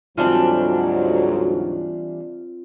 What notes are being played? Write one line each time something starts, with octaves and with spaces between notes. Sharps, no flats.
D2 G#2 E3 F#3 G3 C4 D4 F4